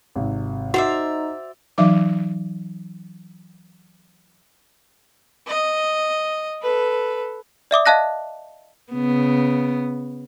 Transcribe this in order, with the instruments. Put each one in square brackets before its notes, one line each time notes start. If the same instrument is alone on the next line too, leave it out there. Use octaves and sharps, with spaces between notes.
[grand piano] G#1 C3
[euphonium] D#4 [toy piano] F#4 F#5 [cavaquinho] C5 D5 E5 [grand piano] F7
[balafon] E3 F#3 D#4 E5 D6
[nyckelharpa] D#5
A4 B4
[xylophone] D5 E5 D6 D#6
D#5 F5 A5 F#6 A#6
[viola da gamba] C#3 B3